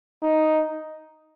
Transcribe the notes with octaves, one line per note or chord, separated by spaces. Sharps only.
D#4